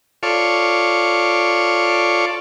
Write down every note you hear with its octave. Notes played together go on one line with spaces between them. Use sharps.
F4 A4 C#5 D5